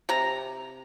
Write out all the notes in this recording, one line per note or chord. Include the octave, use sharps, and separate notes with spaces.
C3 A#5